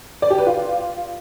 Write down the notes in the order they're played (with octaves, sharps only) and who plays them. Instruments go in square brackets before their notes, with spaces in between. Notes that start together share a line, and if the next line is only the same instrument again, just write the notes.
[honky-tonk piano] D5
G4
B4
F4